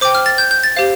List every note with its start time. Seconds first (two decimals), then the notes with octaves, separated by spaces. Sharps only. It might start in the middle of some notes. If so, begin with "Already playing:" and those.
0.01 C5 G5 D6
0.15 F6
0.26 A6
0.38 G6
0.51 G6
0.63 A6
0.77 G4 C5 F5